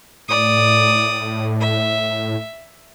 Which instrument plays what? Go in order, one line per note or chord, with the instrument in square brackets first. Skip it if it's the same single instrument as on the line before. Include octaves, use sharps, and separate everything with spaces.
[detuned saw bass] A2 [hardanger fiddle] D5 D#6
[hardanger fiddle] E5